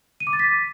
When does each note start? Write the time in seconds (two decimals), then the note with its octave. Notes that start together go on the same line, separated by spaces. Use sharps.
0.20 D#7
0.27 D6
0.33 A6
0.39 B6